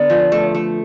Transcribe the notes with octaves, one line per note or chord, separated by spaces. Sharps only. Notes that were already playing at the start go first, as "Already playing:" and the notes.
Already playing: D3 B3 D5
F3
A3
A3